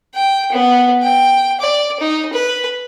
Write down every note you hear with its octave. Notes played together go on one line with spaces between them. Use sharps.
G5
B3
G5
D5
D#4
B4